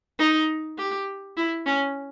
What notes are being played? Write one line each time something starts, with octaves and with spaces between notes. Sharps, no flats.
D#4
G4
E4
C#4